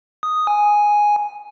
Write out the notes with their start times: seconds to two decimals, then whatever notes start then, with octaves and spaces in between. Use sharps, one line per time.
0.23 D#6
0.47 G#5